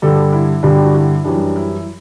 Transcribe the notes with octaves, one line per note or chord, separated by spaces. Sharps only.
G2 D3 G3 A4
E4
G2 D3 G3 D4
F#4
E4
F#2 E3 G3 D4
E4